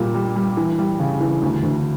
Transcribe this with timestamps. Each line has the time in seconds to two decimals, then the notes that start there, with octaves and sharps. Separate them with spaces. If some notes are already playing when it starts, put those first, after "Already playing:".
Already playing: A#2 G3
0.15 G3
0.36 G3
0.57 E3
0.79 G3
0.99 C#3
1.20 E3
1.42 D2
1.63 D2